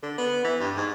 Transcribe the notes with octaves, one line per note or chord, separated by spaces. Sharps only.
D3
B3
E3
G2
G#2